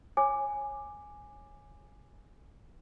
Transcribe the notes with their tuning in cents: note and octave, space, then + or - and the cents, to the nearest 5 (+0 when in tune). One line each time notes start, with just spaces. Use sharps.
C#5 -20 G#5 +0 D6 +10